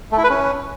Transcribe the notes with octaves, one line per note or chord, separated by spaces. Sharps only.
A3
E4
B4
C#4